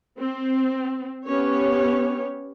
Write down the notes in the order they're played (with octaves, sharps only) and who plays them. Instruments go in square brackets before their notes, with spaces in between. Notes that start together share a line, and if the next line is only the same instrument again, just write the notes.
[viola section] C4
B3 C#4 G4 C#5